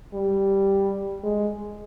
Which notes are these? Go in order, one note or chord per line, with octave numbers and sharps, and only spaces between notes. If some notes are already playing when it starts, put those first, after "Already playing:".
G3
G#3